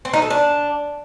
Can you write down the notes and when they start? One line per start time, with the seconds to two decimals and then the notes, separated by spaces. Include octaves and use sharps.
0.05 C4
0.13 D#4
0.22 A4
0.31 D4